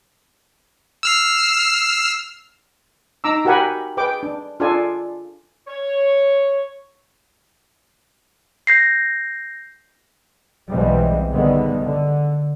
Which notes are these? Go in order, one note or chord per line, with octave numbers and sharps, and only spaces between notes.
E6 F6 C7
D#4 A#5 D6 E6
F#4 G4 A#4 F#5 G#5 B5
G#4 B4 G5 D6
D4
D4 F4 G#4 A4 D5 G#5
C#5
G6 A#6 C7
B1 B2 E3 G3 G#3 C4
A2 D3 D#3 G3 G#3 B3
D3